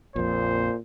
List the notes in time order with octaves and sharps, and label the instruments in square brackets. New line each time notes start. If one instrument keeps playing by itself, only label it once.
[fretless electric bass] A#1 F2 [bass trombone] A#2 [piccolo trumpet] C5